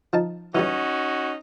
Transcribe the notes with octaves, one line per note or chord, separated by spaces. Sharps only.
F3 D#4 A5
E3 F#3 G3 C#4 D#4 F#4